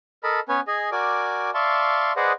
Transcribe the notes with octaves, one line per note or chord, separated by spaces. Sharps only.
A4 A#4 D#5 A5 B5
B3 C#4 B4 C#5 G#5
G#4 D#5 G#5
F#4 A#4 D5 G#5 D6
D5 E5 F5 A5 C6 C#6
G#4 B4 C5 D5 D#5 F#5